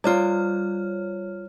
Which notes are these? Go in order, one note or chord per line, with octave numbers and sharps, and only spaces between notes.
G3 F4 C#5 D5 F6